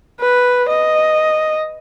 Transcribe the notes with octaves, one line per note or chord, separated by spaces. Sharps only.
B4
D#5